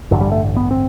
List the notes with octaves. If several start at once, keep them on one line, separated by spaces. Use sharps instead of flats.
A1 G2 D3 F#3
G3
A3
B3
C4